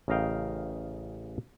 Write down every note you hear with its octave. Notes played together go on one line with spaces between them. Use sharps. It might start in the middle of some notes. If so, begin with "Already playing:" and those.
A1 C#3 A#4 D#5 F5 G5